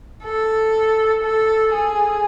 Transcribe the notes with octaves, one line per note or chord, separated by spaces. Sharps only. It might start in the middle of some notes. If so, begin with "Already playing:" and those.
A4
A4
G#4